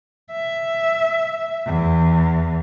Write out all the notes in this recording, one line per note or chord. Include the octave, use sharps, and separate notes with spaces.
E5
E2